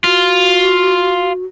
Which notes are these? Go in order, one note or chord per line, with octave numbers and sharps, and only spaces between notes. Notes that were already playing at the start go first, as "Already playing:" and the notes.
F4 F#4